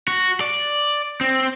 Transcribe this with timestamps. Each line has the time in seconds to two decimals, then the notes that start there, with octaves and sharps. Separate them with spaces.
0.08 F#4
0.41 D5
1.21 C4